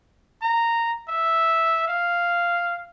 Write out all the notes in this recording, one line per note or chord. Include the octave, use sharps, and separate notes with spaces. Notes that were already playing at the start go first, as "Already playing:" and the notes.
A#5
E5
F5